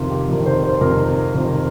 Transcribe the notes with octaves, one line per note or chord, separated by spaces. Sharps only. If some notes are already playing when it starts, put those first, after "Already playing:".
Already playing: F2 C3 D#3 F4
G4
F2 C3 D#3
C5
C5
F2 C3 D#3 A#4
F2 C3 D#3 C5